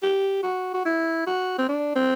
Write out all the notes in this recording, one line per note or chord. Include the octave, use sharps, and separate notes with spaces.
G4
F#4
F#4
E4
F#4
C4
D4
C4